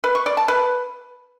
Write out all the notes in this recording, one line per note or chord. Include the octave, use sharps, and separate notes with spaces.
B4
C#6
D5
A5
B4